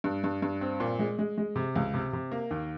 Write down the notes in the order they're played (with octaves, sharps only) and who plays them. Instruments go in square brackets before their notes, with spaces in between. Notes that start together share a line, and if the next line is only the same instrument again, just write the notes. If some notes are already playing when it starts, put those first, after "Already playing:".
[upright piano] G2
G2
G2
C4
A#2
G#3
G#3
G#3
C3
C#2
C3
C3
A#3
D#2